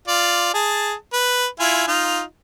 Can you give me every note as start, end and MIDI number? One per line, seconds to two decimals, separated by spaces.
0.08 0.52 65
0.08 0.52 74
0.54 0.94 68
0.54 0.94 81
1.13 1.46 71
1.60 1.86 64
1.60 1.86 65
1.60 1.86 80
1.88 2.22 63
1.88 2.22 65